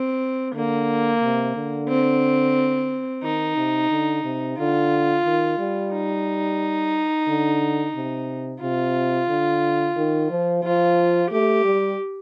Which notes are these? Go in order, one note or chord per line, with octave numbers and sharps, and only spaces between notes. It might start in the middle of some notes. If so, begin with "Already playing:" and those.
Already playing: C4
D3 A#3
C3
D3
C4
D#3 D#4
C3
D3
C3
D3 F4
D#3
G3
D#4
D3
C3
C3 F4
D3
D#3
F3
F3 F4
A3 G4
G3